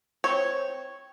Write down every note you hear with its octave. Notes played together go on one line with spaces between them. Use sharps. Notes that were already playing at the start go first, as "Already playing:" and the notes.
C4 C#5